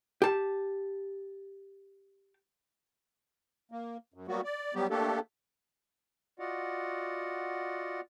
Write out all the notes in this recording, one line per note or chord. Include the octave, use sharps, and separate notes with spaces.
G4 A5
A#3
F#2
F#3 G3 A#3 B3 F#4
D5
F#3 G3 B3 G4
A3 A#3 D4 G4 A4
F4 F#4 D5 D#5 F#5